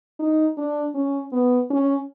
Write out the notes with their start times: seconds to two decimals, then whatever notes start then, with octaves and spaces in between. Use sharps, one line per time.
0.20 D#4
0.57 D4
0.95 C#4
1.32 B3
1.70 C#4